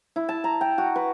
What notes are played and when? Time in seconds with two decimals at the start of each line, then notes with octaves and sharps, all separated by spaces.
0.16 E4
0.29 A5
0.44 A#5
0.61 G5
0.78 F#4
0.96 B4